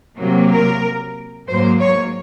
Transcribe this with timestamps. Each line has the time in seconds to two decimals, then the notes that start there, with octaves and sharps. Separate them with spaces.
0.18 C3 F#3 A#3
0.50 A#4
1.47 G#2 F#3 A#3 C5
1.80 C#5